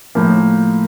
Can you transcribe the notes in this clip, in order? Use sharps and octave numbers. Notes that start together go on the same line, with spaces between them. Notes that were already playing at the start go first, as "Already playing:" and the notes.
A2 F3 A#3